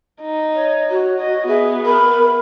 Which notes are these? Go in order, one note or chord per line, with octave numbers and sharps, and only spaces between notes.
D#4
C#5
F#4
D#5
B3 G#4 E5
A#4 B5